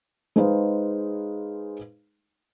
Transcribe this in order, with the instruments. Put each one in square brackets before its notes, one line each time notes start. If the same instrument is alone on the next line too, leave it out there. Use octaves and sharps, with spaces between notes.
[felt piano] G#3 D#4 G#4 B4 C5 F5